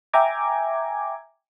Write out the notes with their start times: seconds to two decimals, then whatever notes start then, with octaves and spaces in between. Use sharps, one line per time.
0.13 E5 G5 G#5 A#5 D6 G#6